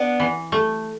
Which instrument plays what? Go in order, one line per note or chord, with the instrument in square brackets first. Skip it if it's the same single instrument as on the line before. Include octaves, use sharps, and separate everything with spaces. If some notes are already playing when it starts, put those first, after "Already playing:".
Already playing: [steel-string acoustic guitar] B3 D4
[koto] E3
A3